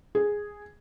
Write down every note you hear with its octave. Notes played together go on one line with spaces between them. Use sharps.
G#4